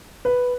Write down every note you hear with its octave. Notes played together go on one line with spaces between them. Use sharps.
B4